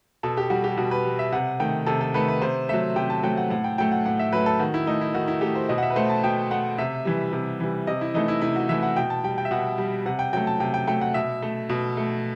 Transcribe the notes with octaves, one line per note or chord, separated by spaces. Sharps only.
B2 A4
G4
G3 F#4
G4
B2 F#4
B4
G3
E5
C3 F#5
D#3 A3 G5
C3 A4
A4
D#3 A3 B4
B4
C3 C5
F#3 A3 E5
C3 G5
A5
F#3 A3 G5
F#5
A2 F#5
G5
F#3 A3 G5
F#5
A2 F#5
E5
F#3 A3 B4
A4
D#3 F#4
E4
A3 D#4
E4
D#3 F#4
E4
A3 G4
C5
B2 D#5
F#5
E5
B4
A3 C5
A5
B2 G5
A3 F#5
C3 E5
E3 G3
C3
E3 G3
C3 D#5
E4
E3 A3 D#4
E4
C3 E4
F#4
E3 A3 E5
F#5
B2 G5
A5
G3 G5
G5
E5
B2 F#5
G3
C3 F#5
G5
F#3 A3 G5
A5
C3 G5
G5
F#3 A3 G5
F#5
B2 E5
A3
B2
A3